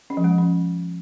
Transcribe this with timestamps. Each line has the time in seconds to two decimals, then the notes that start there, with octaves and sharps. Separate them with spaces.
0.10 C#4
0.17 F3
0.24 G#3
0.31 F3
0.38 C#4